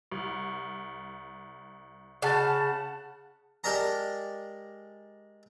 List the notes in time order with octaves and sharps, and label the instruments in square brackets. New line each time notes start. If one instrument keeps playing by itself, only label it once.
[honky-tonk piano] C2
[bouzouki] C#3 [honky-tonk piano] F#5 A5 A6
[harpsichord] G#3 G4 A#4 D5 A5 A#5